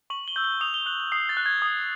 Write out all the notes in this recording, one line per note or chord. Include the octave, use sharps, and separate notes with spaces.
C#6 F#7
G7
E6 G6
G7
D#6 F7
G7
F#6 F#7
F7
D#6 C7
A6
F#6
G#6
D#6